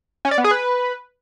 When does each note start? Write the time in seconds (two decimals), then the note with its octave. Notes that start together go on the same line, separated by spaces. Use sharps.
0.25 C#4
0.31 D5
0.38 B3
0.44 G#4
0.51 B4